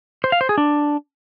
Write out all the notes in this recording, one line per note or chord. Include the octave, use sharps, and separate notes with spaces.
C5
F5
C5
G#4
D4